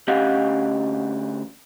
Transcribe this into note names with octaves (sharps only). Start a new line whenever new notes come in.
D2 C#4 G4 D#5 F5 F#5